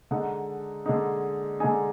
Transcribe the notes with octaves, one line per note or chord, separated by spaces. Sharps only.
D3 G#3 D#4 F#5
D3 G#3 D#4
D3 G#3 D#4 G#5